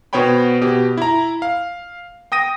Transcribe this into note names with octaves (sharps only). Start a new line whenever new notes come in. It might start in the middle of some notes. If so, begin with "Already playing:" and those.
B2 B3 C5 C#5 G5 B5
B2 G4
E4 A#5
F5
G5 D#6 A#6 D#7